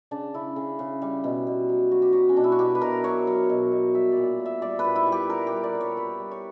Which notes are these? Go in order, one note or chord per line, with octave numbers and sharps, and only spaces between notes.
C#3 D4
C#3 E4
C#3
C#3
G3
B2
B2
F#3
F#3 F#4
G4
F#3 F#4
C#4
B2 D4
E4
F#4
B2 G4
B4
B2 A#4
F#3 C#5
F#3
B2
B2
G3 E5
D5
A#2
A#2
E5
G3 D5
B4
A#2
E4
G3
G4
G3 A#4
G4
G3
D5
G3
C#5
G3 B4
G3
C#5